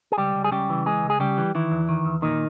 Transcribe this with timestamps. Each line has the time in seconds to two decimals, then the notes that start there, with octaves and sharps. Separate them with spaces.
0.12 G#4
0.18 C#2 G3 G4
0.35 C#2
0.44 G#4
0.52 C#3 G3 G4
0.70 E3
0.86 C#2 G#3 G#4
1.04 C#2
1.10 G#4
1.20 C#3 G3 G4
1.38 E3
1.55 D#3 E3 E4
1.71 E2
1.89 D#3
2.05 E2
2.22 A#2 D#3 D#4